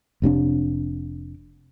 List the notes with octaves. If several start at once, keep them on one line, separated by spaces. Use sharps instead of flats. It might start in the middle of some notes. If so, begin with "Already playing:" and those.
F1 C3 C4 D4